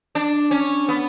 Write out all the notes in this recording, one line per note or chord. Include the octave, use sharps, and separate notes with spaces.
D4
C#4
B3